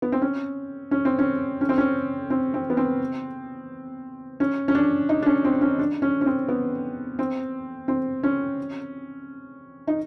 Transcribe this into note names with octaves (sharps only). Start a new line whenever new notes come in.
B3
C4
C#4
C#4
C4
C#4
C#4
C4
C#4
C4
C4
B3
C4
C#4
C#4
D4
D#4
D4
C#4
C4
C#4
D4
C#4
C#4
C4
B3
C4
C4
C#4
D#4